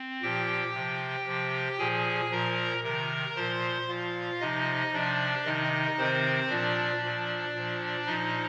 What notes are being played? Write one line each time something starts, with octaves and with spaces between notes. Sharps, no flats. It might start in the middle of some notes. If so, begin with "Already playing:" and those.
Already playing: C4
A#2 F3 G4 G5
C3 F3
C3 F3
A#2 F3 G#4 G#5
A#2 F3 A#4 A#5
C3 D#3 A#4 A#5
A#2 F3 C5 C6
A#2 F3 F4 F5
C3 F3 D#4 D#5
C3 F3 D4 D5
C3 D#3 D#4 D#5
C3 D#3 C4 C5
A#2 F3 D4 D5
A#2 F3
A#2 F3
A#2 F3 D#4 D#5